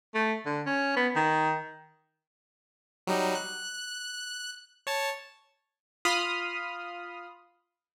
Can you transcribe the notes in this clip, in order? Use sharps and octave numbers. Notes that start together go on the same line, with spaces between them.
A3
D3
C#4
B3
D#3
F#3 G3 D#4
F#6
C#5 A5
F4 B5 C6 D#6 F6